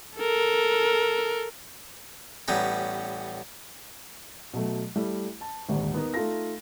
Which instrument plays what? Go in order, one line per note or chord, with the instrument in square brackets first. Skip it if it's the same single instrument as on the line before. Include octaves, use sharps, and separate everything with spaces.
[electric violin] A4 A#4
[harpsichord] A1 G3 B3 C#4 A#5
[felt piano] B2 F#3 A3
G3 A3 E4
A5
D#1 G#1 D2
B3 D#4 A#4
A3 D#4 F4 A4 A#6